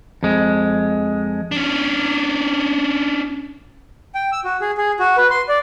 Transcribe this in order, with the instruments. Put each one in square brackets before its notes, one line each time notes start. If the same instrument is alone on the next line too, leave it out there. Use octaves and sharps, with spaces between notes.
[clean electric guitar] F2 G#3
[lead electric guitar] C#4 D4
[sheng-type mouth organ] G5
E6
F#4
G#4
G#4
F#4
B4
C6
D5